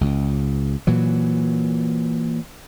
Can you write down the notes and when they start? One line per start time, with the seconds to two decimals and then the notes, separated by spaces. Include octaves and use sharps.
0.01 C#2
0.87 A#2 E3 F#3